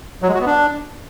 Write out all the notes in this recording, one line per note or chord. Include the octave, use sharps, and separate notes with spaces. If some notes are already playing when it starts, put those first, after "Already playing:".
F#3
G#3
F#4
B3
D4